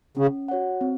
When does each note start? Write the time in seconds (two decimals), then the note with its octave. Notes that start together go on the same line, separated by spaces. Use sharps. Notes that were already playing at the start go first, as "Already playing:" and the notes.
0.17 C#3 C#4
0.48 F#4 C#5 F#5
0.81 C4